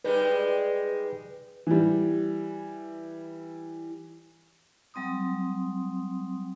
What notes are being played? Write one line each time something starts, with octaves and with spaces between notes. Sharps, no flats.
G3 G#3 D#4 B4
E3 G3
F#3 G3 C4 C6 D#6